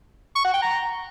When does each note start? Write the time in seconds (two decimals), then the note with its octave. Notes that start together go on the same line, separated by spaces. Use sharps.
0.36 C#6
0.45 F#5
0.54 G5
0.62 A#5